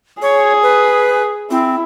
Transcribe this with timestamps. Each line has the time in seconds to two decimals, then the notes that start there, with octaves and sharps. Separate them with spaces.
0.22 G#4 C#5
0.63 B4
1.50 C4 E4